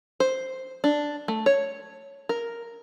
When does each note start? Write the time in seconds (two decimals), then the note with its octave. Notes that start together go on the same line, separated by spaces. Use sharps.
0.20 C5
0.84 D4
1.28 A3
1.46 C#5
2.29 A#4